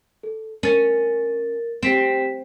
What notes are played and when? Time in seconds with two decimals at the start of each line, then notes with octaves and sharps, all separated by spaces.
0.23 A4
0.63 C#4 A#4 A6
1.83 C4 G4 B6 E7